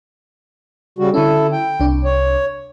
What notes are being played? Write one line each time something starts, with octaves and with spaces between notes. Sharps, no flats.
C#3 G3 F#4
D3 C#4 E4 A4
G5
C2 D4
C#5